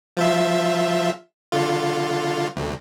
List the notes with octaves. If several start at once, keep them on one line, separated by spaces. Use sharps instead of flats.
F3 F4 E5
D3 F4
D2